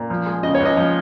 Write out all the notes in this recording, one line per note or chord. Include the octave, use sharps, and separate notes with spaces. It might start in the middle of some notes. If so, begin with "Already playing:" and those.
Already playing: A#2
F3
G#3
C#3 D#5
C#5
C#2
D#5
F3 D#5